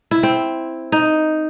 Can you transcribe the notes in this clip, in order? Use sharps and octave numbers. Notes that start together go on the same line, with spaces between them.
E4
C4
D#4